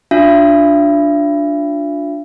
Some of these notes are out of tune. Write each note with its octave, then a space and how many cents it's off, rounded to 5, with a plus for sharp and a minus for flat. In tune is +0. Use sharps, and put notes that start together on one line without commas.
D4 +0 F4 +30 E5 +40